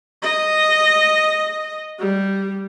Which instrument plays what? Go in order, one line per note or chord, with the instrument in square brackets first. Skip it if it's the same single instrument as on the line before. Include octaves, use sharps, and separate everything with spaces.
[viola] D#5
G3